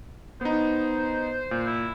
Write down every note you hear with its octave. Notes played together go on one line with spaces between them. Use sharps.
B3 D#4 C5
A#2
E4